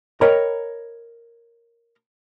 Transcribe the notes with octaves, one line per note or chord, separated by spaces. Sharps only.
A#4 C#5 D#5 G5 A#5 B5